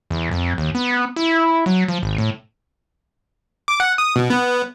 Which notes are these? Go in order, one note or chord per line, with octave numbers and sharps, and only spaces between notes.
E2
F2
D#2
B3
E4
F#3
F3
G#1
A2
D6
F#5
D#6
B2
B3